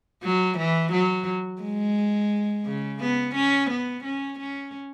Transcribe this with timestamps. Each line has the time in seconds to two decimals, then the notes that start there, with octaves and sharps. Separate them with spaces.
0.23 F#3
0.58 E3
0.92 F#3
1.62 G#3
2.65 C#3
3.00 B3
3.35 C#4
3.70 B3
4.04 C#4
4.39 C#4